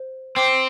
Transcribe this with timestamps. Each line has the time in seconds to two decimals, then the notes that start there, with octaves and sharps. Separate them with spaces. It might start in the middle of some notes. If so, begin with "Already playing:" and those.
Already playing: C5
0.36 C4 C5 G5 D6